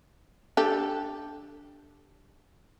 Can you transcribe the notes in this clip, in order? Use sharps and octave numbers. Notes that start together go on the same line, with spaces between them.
D4 G4 A4